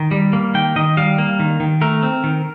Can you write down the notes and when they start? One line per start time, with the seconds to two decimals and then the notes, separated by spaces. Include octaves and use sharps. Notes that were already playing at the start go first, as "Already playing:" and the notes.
Already playing: D#3
0.11 G3
0.33 A#3
0.54 D#3 G5
0.76 D#3 D#5
0.97 G3 F5
1.18 A#3
1.40 D#3
1.60 D#3
1.81 A3 A#4
2.03 C4
2.24 D#3